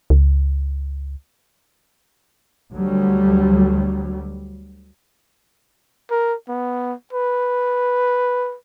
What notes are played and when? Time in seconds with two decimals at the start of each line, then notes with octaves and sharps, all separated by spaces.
0.10 C#2
2.71 D2 F#3 G3
6.11 A#4
6.48 B3
7.13 B4